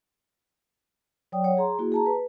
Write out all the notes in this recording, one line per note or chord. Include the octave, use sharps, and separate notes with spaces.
F#3 C#5 D5 G5 D#6
C#5 F#5
G#4 A#5 C6
A#3 E4 F#4 G#4
G#4 A5 A#5
B4